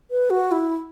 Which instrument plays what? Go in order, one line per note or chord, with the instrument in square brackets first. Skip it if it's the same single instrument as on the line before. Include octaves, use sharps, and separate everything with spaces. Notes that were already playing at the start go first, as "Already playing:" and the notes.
[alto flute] B4
F#4
E4